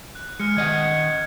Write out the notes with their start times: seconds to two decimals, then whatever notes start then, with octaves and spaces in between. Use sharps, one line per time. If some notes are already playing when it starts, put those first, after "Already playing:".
0.15 F#6
0.40 G#3 F6 C#7
0.57 D#3 D#5 F#5 G#6